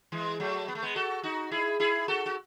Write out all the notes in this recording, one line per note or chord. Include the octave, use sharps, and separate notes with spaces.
E3 G#3
F#3 A3
B3
A3
G#3 B3
F#4 A4
D#4 F#4
E4 G#4
E4 G#4
F#4 A4
F#4